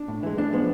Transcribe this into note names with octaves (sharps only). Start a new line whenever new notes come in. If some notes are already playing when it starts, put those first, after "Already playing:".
Already playing: D4
A2
E3 G#3
A2 D4
F3 G#3 B3